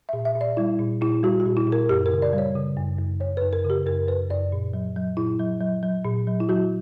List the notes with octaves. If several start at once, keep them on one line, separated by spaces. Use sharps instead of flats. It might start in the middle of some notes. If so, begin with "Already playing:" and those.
A#2 E5
E5
A#2
D5
G3 E4
A#2
A#2 E4
G3 F#4
F#4
A#2
E4
A#2
A#4
F#2 G4
A#4
C#3
D5
G3
C#5
C#3
F#2
F#2
F#2 C#5
B4
F#2
A#4
C#3
G4
F#2 A#4
F#2 B4
F#2 D5
A#2
F#3
F#3
A#2 E4
F#3
F#3
F#3
A#2
F#3
E4
F#3 F#4